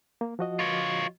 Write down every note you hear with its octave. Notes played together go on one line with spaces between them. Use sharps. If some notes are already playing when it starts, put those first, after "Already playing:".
A#3
F3 F#4 D#5
F4 C#5